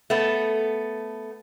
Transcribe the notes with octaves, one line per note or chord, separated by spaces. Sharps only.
A3 B3